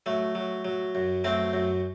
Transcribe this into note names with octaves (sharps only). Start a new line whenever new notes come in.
F#3 A3
F#3
F#3
F#2
F#3 A3 C4
F#2